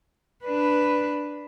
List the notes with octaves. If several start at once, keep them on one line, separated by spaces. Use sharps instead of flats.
D4 B4